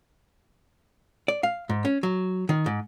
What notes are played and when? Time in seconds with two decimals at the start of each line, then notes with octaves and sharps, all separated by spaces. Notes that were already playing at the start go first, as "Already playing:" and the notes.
1.28 D5
1.43 F5
1.69 G#2
1.85 C#4
2.03 F#3
2.49 D#3
2.66 G#2